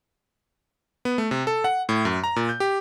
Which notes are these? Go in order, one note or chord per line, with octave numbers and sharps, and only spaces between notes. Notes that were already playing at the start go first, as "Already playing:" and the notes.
B3
A3
C3
A4
F#5
A2
F#2
A#5
A#2
G6
G4